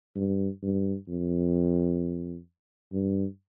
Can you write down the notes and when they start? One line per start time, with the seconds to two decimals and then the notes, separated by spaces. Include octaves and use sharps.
0.16 G2
0.63 G2
1.08 F2
2.93 G2